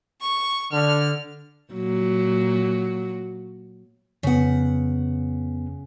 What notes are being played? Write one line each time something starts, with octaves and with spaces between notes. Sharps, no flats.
C#6
D3 F6
A#2 F#3
F2 C#3 B3 F#5